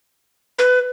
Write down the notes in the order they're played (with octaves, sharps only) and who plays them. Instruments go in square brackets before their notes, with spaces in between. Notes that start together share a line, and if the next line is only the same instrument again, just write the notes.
[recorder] B4